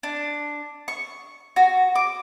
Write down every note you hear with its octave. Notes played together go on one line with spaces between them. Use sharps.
D4
C#6
F#4
D6